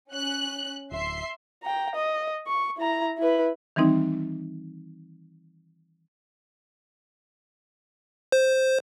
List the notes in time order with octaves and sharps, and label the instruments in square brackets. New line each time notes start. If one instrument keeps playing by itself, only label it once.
[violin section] C#4 F#6
[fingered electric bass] D1 [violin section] E5 C6 C7
[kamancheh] G5 A#5
D#5
C#6
E4 A#5
E4 B4
[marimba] D#3 E3 G3 C4 D#4
[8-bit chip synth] C5